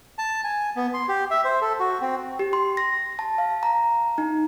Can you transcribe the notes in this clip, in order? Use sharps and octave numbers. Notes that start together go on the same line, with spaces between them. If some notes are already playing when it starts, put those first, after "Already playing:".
A5
G#5
B3
C6
G4
E5
C5
A4
F#4
C4
G4
C6
A#6
A5
F5
A#5
D#4